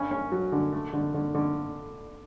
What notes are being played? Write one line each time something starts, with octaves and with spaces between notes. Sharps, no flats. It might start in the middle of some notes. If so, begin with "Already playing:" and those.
Already playing: G2 C#4
C#4
F#3
D3
A3
D3
D3
D3